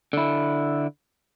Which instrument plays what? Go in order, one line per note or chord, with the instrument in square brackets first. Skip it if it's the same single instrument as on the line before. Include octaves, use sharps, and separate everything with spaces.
[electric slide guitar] D3 E4